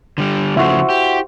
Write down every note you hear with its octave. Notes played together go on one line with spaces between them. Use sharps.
D3 G3
C#3 F3 A3 E4 F#4 C5
G4